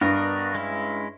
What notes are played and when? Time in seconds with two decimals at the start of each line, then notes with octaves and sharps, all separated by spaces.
0.01 G2 B3 D4 F#4 A#4 D#5
0.55 G#3 C#4 E4